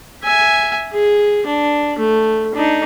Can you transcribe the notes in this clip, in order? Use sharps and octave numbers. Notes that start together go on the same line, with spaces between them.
E5 G#5
G#4
D4
A3
D4 D#4